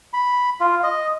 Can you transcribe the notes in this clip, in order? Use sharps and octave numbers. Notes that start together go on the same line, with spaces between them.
B5
F4
D#5